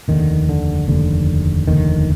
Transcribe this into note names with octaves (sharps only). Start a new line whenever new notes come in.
F1 D#2 D3 D#3
D3
F1 D#2 D3
F1 D#2 D3 D#3